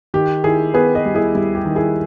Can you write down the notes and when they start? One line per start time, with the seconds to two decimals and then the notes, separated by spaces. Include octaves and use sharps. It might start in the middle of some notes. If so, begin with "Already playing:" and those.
0.14 D#3 G4
0.44 D#3 E4 G#4
0.74 B3 G#4 B4
0.95 B4 D#5
1.05 G3
1.14 E4 G#4
1.35 G3 E4
1.55 G4
1.65 D#3
1.75 E4 G#4